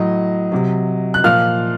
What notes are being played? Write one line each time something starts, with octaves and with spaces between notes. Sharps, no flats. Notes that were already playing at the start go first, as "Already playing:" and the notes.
Already playing: A2 F#3 D#5
C3 F#3
F#6
A#2 F3 F5 F6